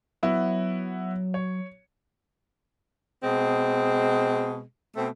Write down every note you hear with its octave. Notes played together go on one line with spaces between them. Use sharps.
F#3 B3 E4 F#4
C#5
B2 G#3 C4
B2 A3 C4